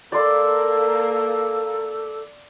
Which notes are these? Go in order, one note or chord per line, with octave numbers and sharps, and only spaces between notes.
A#3 A4 D5 C6